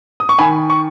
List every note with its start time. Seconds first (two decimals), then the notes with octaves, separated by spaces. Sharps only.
0.20 D#6
0.29 C#6
0.38 D#3 G#5 B5
0.70 C#6